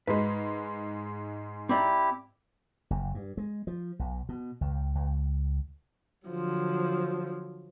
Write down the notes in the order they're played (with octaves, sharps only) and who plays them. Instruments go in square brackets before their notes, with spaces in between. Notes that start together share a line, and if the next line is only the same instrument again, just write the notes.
[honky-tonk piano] G#2 G#3 [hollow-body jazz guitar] B4
[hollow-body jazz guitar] C4 D5 A#5 [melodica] E4 G4
[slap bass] F#1
G2
G#3
F3
B1
B2
C#2
C#2
[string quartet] D3 F3 F#3